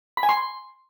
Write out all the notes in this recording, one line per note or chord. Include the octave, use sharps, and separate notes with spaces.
B5
G#5
C6